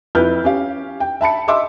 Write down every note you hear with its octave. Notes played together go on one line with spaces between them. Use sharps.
F2 E4 B4 F6 G6
C#4 G4 F5
G5
E5 A5 B5 C#7
D#5 E5 C6 D6 E6